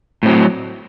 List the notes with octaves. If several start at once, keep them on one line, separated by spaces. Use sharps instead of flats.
A2 F#3 C4